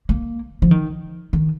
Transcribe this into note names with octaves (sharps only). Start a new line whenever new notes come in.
A#3
F3
D#3
D#3